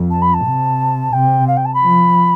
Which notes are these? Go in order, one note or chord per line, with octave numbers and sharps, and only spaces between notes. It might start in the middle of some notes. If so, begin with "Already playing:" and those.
Already playing: F2
A5
B5
A5
C3
C3 G5
F5
G5
A5
B5
F3